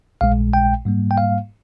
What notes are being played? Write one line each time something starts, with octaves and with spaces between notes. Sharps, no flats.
A#1 A#2 G#3 F5
G5
G#2 G3 A#3
G5
F5